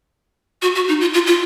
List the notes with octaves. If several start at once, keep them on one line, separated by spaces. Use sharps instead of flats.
F#4
F#4
D#4
F4
F4
F4